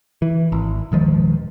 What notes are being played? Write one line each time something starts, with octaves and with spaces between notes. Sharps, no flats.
E3
G#1
D#1 D#3 F3 G#3